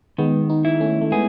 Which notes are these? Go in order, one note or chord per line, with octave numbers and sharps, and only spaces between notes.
D#3 G#3 B3
B3 D#4
E4
A3 C#4
A3
G#3 B3 G#4